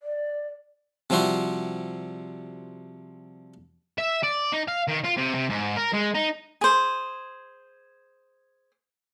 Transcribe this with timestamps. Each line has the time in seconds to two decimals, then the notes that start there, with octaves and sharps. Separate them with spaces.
0.02 D5
1.10 C3 F3 G3 E4 F#4 C6
3.98 E5
4.23 D5
4.52 D#4
4.68 F5
4.88 D#3
5.04 F4
5.17 C3
5.34 C3
5.50 G#2
5.77 A#4
5.93 G#3
6.15 D#4
6.61 G#4 C5